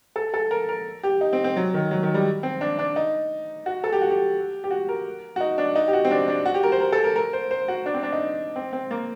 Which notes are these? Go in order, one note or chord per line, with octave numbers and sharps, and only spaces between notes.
A4
A4
A#4
A#4
G4
D#4
C4
C4
F#3
D#3
F#3
D#3
G3
C4
D4
D4
D#4
F#4
A4
G4
F#4
G4
G4
F#4
A#4
F#4
D#4
D4
D#4
G4
F#4
C4
D4
D4
F#4
G4
A#4
C5
A#4
A4
A#4
A#4
C5
C5
F#4
D4
C4
D4
D#4
C4
C4
A#3